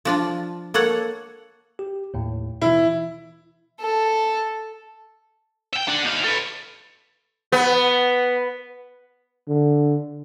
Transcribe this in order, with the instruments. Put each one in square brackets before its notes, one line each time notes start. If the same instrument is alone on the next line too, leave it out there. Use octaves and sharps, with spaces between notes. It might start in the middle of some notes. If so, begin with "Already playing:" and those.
[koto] F3 D4 F4
A#3 A4 C#5 F#5
[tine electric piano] G4
D#2 A2
[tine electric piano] B2 E3 [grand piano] E4
[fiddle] A4
[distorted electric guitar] E5 G5
D4 F#5
D#4 F5
A4 B4
[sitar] B3
[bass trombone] D3